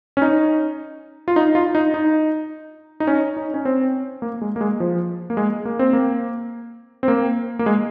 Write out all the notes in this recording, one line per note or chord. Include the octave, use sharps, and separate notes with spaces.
C#4
D#4
F4
D#4
F4
D#4
D#4
D#4
C#4
D#4
C#4
C4
A#3
G#3
A#3
G#3
F3
A#3
G#3
A#3
C4
A#3
C4
A#3
A#3
G#3